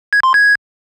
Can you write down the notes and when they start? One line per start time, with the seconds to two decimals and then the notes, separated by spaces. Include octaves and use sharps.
0.13 G#6
0.23 C6
0.34 G#6